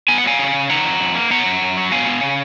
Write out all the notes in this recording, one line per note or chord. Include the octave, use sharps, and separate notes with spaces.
B3 G#5
F#5
F#3 F5 G#5
C#3
C#3
D#3 F#5 A#5
F2
F2
A#3
B3 F#5 A#5
F#2
F#2
F#3
B3 F5 G#5
B3
C#3